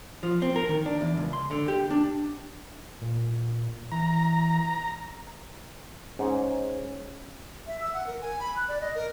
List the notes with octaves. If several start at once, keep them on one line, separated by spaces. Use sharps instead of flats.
F3
C4
A#4
D#3
D4
E2
C#2
C6
D3
G4
D4
A#2
E3 A#5
G#2 C#4 C#5
E5
E6
F#5
A#4
G#5
B5
F#6
D5
D#5
A#4